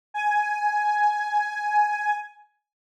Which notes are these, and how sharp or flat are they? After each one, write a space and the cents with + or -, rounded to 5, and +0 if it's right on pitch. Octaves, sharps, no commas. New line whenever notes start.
G#5 +10